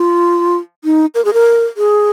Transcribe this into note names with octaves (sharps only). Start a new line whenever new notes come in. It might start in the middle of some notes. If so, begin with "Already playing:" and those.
Already playing: F4
D#4
A#4
G#4
A#4
G#4